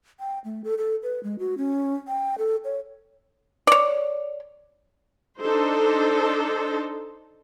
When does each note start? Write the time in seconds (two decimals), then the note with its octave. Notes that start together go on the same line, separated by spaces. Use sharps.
0.20 G5
0.45 A3
0.64 A4
0.78 A4
1.03 B4
1.23 G#3
1.39 F#4
1.57 C#4
2.08 G5
2.38 A4
2.65 C#5
3.67 C#5 D5
5.41 D4 D#4 A4 C5